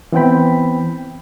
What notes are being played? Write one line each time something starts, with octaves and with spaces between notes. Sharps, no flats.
E3 B3 C4 G5 B5